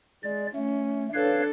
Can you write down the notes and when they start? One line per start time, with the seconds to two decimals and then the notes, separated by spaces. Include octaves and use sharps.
0.23 G#3 D5
0.55 A3 C#4
1.14 D4 A4 B4 C#5 F5